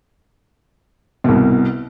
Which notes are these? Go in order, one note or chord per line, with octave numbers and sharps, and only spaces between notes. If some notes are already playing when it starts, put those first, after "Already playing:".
C2 B2